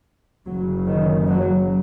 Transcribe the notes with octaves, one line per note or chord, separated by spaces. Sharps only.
F#1 F#2 C#3 F#3
D#3
F#3